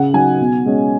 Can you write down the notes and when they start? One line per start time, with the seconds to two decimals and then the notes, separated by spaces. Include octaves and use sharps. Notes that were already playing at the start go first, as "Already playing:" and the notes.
Already playing: C#3 F#5
0.14 F#3 D#4 G#5
0.40 B2
0.66 G#3 C#4